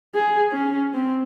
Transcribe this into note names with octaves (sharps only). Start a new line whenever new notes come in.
G#4
C#4
C4